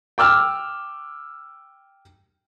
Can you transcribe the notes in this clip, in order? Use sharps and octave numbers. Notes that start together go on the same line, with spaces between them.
G5 D6 E6 F6